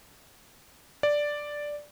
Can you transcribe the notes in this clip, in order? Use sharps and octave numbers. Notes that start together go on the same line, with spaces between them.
D5